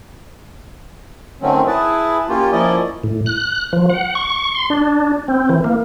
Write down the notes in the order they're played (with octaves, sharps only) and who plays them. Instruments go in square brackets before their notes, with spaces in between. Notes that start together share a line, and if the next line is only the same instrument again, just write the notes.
[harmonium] D3 D#3 F#3 A3 C4 C#4
E4 G#4 B4 A5
A#3 C#4 F4 G4
F3 A#3 C#4 E4 D5 D#5
[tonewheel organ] A2
F#6
F3
F#5
C#6
C6
D4
C4
E3
A#3